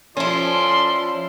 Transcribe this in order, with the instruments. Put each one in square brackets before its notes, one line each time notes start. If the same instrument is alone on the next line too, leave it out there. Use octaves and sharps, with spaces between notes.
[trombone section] F3 [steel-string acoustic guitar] C#4 E4 [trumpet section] A4 D5 C6